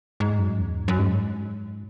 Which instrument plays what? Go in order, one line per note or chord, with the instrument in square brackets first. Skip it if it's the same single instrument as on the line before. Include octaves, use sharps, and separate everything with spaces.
[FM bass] G#2
F#2
E2
G#2
F#2
G#2